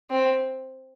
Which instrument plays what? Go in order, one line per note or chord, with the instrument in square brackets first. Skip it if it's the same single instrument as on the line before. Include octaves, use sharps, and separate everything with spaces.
[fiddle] C4